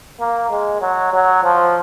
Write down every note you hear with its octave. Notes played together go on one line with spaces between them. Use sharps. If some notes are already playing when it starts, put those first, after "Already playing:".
A#3
G#3
F#3
F#3
F3